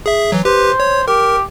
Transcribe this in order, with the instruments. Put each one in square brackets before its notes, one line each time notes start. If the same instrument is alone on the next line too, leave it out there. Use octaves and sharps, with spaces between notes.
[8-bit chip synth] G#4 E5
E3 F#3
[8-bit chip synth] G4 B4 [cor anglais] C5
[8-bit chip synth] C#5
[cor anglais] G4 [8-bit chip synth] A#4